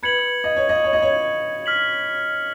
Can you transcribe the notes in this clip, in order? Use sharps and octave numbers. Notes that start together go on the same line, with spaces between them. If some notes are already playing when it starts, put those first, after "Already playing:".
B4 G#6 C#7 F#7
D#5
C#5
D#5
C#5
D#5
C#5
F6 B6 F#7